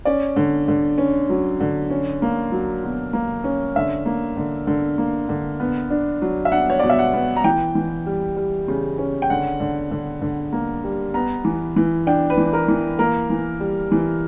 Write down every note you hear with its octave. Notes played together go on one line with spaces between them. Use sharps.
C#4 D5
D3
D3
C#4
F#3
D3
C#4
A#3
F#3
B2
A#3
C#4
D3 E5
A#3
D3
D3
A#3
D3
B3
D4
F#3
E5
D4 F#5
C#5
B2 D5
E5
F#5
B3
A#5
E3 G5
E3
G3
G3
C#3
C#4
G5
D3 F#5
D3
D3
D3
A#3
G3
B3 A#5
E3
E3
D4 G5
B4
E3
A#4
E3
A#3 A#4
E3
G3
E3